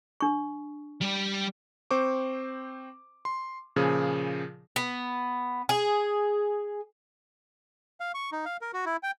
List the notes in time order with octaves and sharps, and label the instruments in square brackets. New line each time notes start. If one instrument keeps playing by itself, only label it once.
[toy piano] D4 C#6
[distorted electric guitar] G3 G4
[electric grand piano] C4 C5 C#6 D6
C6
A#2 C#3 F3 G#4
[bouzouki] B3
G#4
[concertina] F5
C#6
D#4
F5
A#4
F#4
E4
G5